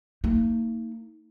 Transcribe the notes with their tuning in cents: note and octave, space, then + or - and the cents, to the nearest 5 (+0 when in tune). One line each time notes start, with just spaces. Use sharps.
A#3 -35 D#4 +30